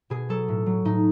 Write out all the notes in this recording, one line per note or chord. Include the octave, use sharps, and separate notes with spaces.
B2 G#4
F#3 A4
A2
F#3
A2 D#4